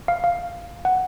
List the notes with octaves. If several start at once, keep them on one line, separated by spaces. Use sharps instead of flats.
F5
F5
F#5